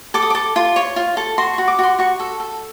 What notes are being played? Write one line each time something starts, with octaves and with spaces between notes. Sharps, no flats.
A4 D6
D#6
A4 D6
F4
C#5
F4
A4
F#4 C6
C#6
F#4
D6
F#4 C6
F#4 C#6
A4
A4